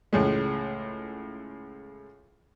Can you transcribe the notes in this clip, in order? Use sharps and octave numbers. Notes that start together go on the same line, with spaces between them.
C#2 A2 G#3